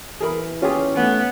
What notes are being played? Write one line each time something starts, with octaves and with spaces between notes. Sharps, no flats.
E3 G#4 A#4 B5
C#4 F4 G4 G#4
A3 B3